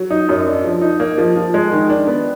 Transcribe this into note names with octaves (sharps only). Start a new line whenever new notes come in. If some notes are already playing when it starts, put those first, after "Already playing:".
Already playing: F#3
D#4
F#2
D4
F3
D#4
A#3
F3
F3
G#3
D#3
D4
B3